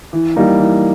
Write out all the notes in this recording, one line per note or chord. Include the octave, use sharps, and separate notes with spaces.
E3
G3 A#3 D#4
E3